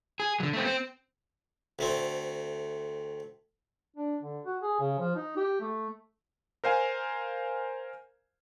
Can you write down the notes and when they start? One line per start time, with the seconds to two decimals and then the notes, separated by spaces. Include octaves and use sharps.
0.20 G#4
0.40 D3 F#3
0.53 A3 C4
0.65 C4
1.79 D2 A3 C4
3.96 D4
4.23 D3
4.46 F#4
4.62 G#4
4.80 C#3
4.99 F3
5.16 D#4
5.36 G4
5.61 A3
6.64 A#4 C5 F5 G#5